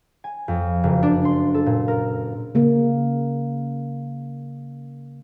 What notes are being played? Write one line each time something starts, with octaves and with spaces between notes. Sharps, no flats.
G#5
F2
F#1
D4
C6
A4
A#2
A#4
C#3 A#3